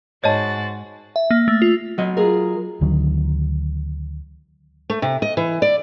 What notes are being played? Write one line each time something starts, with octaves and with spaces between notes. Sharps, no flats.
G#2 F#4 C#5 D#5 A5 A6
E5
A#3
A3
F4
F#3 D#5
F4 G#4 A#4
D2 D3 D#3 F#3
A3
C3
D#5
E3
D5